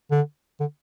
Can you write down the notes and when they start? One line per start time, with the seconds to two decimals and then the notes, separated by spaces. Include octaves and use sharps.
0.11 D3
0.60 D3